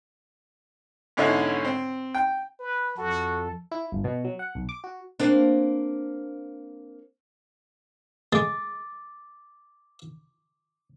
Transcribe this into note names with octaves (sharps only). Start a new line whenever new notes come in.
G#2 B2 D3 C#4 E4
C4
G5
B4
F2 F#4 A4
E4
G1
B2
F#3
F#5
B1
D6
F#4
A#3 C4 D4
G#3 D6 A6